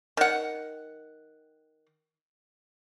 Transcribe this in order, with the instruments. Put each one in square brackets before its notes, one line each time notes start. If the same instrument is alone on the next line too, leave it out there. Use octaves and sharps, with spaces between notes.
[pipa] D#3 F#5